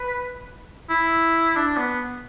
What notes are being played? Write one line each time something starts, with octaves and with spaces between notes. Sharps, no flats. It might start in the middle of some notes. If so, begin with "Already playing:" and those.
Already playing: B4
E4
D4
B3